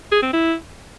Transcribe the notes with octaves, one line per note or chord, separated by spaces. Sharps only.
G#4
C4
E4